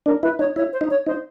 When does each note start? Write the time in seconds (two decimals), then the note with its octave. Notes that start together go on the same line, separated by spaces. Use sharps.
0.06 D4 A#4
0.23 E4 B4
0.39 D#4 C#5
0.56 E4 C#5
0.72 C5
0.81 D#4
0.90 C#5
1.06 D#4 C5